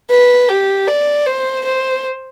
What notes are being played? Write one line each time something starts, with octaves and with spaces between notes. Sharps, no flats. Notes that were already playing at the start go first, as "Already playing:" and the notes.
B4
G4
D5
C5
C5